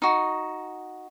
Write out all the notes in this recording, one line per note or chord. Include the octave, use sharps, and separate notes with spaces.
D#4 F#4